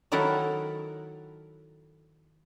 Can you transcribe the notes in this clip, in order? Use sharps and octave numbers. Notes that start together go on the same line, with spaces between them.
D#3 F#3 E4 A4 A#4 F#5